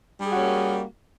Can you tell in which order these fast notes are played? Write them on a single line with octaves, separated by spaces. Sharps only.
G3 G#4 F#4 C#4 A#3